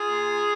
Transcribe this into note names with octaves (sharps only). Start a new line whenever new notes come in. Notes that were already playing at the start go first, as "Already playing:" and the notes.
Already playing: F4 G#4
A#2